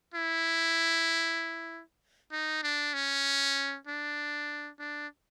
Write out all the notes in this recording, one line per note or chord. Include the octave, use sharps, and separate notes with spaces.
E4
D#4
D4
C#4
D4
D4